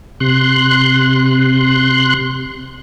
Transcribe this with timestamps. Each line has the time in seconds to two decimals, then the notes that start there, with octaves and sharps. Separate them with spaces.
0.20 C3 C6 F#6